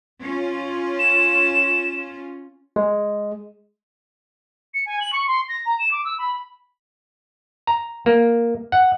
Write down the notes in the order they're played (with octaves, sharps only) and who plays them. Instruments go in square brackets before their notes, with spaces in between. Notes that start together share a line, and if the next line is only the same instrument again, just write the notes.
[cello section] C#4 F4
[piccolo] E7
[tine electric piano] G#3
[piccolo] C#7
G#5
F#7
C#6
C6
A#6
A#5
E7
D6
E6
B5
[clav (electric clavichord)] A#5
A#3
F#5